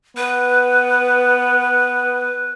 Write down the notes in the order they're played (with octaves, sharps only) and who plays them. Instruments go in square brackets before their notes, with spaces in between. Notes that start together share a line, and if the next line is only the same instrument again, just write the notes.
[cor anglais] B3 [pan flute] B4